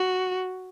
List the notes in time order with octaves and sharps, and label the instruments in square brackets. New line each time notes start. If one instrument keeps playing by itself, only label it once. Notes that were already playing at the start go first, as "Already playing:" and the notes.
Already playing: [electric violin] F#4